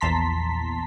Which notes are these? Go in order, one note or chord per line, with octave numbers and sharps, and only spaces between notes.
A#1 E2 A5 A#5 C6 B6